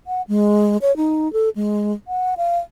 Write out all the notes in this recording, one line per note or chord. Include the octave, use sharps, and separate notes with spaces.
F#5
G#3
C#5
D#4
A4
G#3
F#5
F5